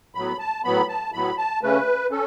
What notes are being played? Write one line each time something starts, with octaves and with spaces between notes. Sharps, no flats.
A2 F#3 B3 B5
A5
A2 F#3 B3 B5
A5
A2 F#3 B3 B5
A5
C#3 A3 C#4 B4
C#4 A4